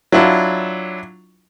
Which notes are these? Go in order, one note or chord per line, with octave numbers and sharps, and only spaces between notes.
F#3 D4 E4 F4